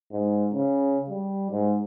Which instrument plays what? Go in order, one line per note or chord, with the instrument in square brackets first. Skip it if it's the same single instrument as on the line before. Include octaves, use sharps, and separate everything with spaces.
[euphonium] G#2
C#3
G3
G#2